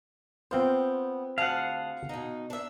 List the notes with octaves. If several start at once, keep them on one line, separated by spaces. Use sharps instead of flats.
B3 C4 F4 C5 G5
D2 G#4 F5 F#5 A5
B2 D#4
D4 E5